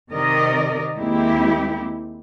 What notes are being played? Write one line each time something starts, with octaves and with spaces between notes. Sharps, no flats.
C3 D#3 A#4 D5 D#5
D#2 G#3 A#3 C4 E4 G4